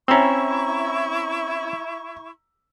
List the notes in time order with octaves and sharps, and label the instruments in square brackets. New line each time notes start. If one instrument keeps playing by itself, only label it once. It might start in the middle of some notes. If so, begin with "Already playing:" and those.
[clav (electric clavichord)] C4 C#4 [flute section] E4 C#6 [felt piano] A#5 B5 E6